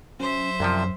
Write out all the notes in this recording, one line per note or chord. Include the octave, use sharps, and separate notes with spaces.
F#3 C#4 C5 E5
C2 F#2 C3 F3